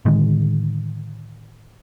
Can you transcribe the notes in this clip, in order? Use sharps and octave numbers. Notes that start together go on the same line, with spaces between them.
A2 D3 D#3 G#3